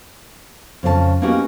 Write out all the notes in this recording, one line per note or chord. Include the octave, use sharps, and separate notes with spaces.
F2 C#3 F4 A5
A#3 B3 C#4 D#4 F#4 G4